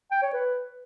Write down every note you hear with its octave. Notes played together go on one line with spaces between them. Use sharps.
G5
C#5
B4